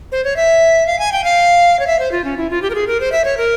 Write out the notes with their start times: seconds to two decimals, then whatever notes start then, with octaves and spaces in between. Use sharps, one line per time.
0.12 C5
0.24 C#5
0.36 E5
0.86 F5
0.99 G#5
1.12 G5
1.24 F5
1.79 C#5
1.87 E5
1.99 C5
2.12 F4
2.24 C#4
2.37 E4
2.50 F4
2.62 G4
2.70 A#4
2.75 G#4
2.87 A#4
3.00 C5
3.12 E5
3.25 C#5
3.37 A#4